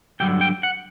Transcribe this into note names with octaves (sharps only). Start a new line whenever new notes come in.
G2 D3 F#3 G5
G5
F#5